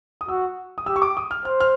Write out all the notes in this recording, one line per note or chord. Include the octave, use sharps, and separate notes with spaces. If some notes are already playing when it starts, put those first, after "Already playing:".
D#6
F#4 E6
D#6
G4 E6
C#6
D6
D#6
F6
C5 F6
F6